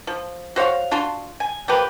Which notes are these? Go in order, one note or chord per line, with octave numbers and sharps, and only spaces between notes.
F3
F#4 C5 C#5 F5
D4 F4 F#4 C6
G#5
F3 A#3 G4 B4